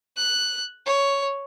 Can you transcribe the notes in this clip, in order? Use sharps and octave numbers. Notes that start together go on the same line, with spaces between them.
F#6
C#5